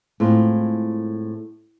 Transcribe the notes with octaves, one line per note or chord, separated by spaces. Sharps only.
A2 G#3 C4 F4